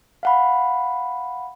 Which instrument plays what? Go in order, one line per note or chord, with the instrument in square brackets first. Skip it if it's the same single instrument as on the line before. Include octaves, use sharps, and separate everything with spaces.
[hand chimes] F5 F#5 B5